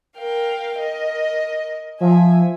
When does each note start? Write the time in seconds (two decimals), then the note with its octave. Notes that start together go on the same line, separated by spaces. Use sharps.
0.18 A#4 F5 G5
0.79 A#4 D#5
2.01 F3 E5 G#5